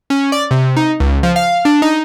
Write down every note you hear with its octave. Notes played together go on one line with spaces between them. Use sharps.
C#4
D5
C3
D#4
C#2
F3
F5
D4
D#4